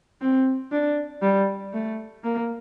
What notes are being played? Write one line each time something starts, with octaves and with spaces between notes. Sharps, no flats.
C4
D4
G3
A3
A#3